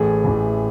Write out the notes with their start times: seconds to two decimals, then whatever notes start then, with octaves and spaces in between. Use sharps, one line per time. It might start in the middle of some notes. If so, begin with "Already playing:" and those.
Already playing: A1 A2 E3 G#4
0.24 A1 A2 E3